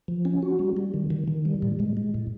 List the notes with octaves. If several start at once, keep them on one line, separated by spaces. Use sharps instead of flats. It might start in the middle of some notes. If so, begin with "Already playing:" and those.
F3
C#4
F#4
G3
G3
D#3
D#3
D#3
G3
A2
G#3
G#3
A2